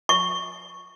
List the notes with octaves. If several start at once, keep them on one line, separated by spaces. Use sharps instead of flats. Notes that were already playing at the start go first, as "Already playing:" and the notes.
C#6